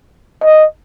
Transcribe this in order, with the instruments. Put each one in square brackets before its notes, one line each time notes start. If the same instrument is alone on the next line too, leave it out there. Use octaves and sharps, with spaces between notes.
[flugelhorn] D#5